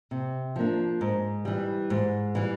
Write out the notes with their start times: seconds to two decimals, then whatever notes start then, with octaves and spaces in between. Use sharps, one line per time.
0.11 C3
0.56 F3 A#3 D4
1.01 G#2
1.45 E3 G3
1.90 G#2
2.35 E3 G3